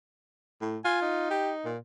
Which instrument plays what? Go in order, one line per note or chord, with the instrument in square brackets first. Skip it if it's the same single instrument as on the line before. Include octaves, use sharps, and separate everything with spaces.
[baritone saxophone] A2
[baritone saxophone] F4 [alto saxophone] G#5
[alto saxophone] D#4
[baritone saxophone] G4
A#2